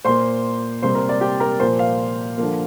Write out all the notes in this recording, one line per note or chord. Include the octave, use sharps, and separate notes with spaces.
A#2 A#3 C5 C6
C3 G3 A#3 C5 C6
A#4 A#5
D5
G4 G5
A#4 A#5
A#2 F3 A#3 C5 C6
F5
D3 F3 A#3